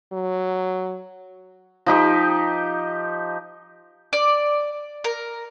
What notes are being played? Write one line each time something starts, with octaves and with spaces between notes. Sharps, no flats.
F#3
F3 D#4 G4
D5
A#4